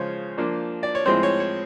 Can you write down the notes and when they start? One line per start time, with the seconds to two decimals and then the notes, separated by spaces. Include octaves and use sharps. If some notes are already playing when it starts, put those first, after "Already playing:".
Already playing: C#3 F3 G#3 C5 C#5
0.38 F3 A#3 D4
0.83 D5
0.95 C#5
1.06 A2 F3 G#3 C4 C5
1.23 C#5
1.40 C#5